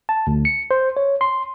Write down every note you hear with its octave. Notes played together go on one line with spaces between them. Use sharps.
A5
D2
C#7
C5
C#5
C6